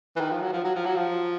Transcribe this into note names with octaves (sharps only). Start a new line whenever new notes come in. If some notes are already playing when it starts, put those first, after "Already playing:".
E3
D#3
F3
F#3
F3
F#3
F3
F#3
F3